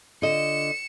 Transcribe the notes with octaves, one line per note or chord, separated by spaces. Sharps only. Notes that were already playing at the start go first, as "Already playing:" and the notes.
D3 F4 D#5 C#7 E7